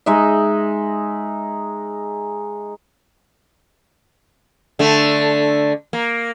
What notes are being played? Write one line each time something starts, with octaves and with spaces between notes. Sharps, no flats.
G#3 D#4 E5
D3 A3
A#3